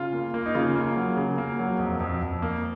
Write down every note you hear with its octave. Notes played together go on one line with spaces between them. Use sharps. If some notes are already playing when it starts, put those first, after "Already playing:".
Already playing: C#3 F4
A#3
A#3
D#4
C#3 F4
A#3
F#3
C#3
A#3
F#3
F2
F2
F2
A#3